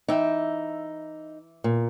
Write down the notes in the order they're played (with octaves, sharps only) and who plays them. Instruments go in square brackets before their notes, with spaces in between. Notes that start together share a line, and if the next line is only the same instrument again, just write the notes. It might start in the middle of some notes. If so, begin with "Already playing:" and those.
[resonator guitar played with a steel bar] E3 E5 G5 [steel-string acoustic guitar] D#4
[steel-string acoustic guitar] A#2